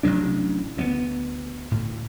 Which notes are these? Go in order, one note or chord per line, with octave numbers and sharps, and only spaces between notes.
A1 C3 F#3 D4
D2 A#3 B3
D2 A2